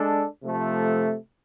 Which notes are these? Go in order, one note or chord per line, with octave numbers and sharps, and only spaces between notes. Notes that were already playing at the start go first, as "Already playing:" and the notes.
Already playing: G#3 D4 A4
C3 F3 A3